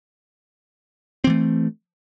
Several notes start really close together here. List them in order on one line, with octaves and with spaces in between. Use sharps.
C4 E3 A3